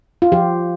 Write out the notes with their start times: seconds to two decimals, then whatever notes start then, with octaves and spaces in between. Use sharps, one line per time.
0.22 F4
0.32 F3 G4